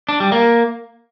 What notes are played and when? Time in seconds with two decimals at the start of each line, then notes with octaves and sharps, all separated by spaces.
0.09 D4
0.20 G3
0.32 A#3